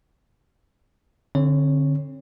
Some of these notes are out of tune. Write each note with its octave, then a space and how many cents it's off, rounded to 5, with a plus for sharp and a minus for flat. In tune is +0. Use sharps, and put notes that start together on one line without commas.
D3 +0 C4 +35 C#5 +0